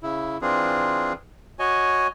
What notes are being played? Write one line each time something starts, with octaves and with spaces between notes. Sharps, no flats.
C#3 E4
E3 C4 D4 F4 G#4
F#4 C#5 D#5 G#5